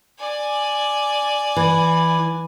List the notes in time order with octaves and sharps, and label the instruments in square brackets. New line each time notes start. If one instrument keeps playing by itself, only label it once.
[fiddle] D5 G#5
[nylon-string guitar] E3